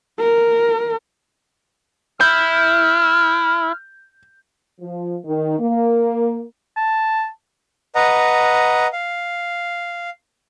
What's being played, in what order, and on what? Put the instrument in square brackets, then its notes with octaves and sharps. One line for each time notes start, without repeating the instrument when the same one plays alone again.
[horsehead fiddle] A#4
[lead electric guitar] E4 [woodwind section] F6 [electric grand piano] G6
[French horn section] F3
D#3
A#3
[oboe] A5
[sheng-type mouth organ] B4 D#5 F#5 A#5
F5